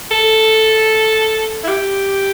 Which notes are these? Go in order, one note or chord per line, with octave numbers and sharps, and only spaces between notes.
A4
E4
G4